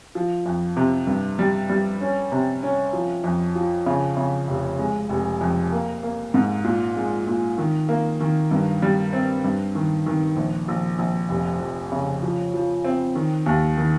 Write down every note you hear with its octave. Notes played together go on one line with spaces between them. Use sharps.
F3
F2
C3
G2
G3
G3
C#4
C3
C#4
F3
F2
F3
C#3
C#3
F1
G#3
F1
F2
A#3
A#3
G#2
A#2
G#3
A#2
D#3
A#3
D#3
G2
G3
C4
G2
D#3
D#3
A#1
A#1
A#1
F1
F2
C#3
F3
F3
C4
D#3
D#2
D#3